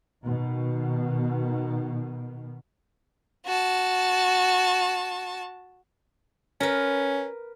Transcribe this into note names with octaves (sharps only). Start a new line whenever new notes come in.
B2 D#3
F#4 A5
C#4 A#4 B4